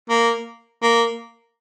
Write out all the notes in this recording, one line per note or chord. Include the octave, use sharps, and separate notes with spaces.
A#3
A#3